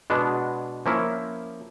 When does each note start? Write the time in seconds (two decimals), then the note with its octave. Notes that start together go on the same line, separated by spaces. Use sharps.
0.10 B2 G#3 B3 D4
0.86 F3 A#3 C#4 E4